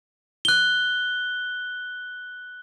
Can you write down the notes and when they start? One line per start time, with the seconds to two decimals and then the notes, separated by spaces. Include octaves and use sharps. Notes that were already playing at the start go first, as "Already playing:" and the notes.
0.45 F#6 G7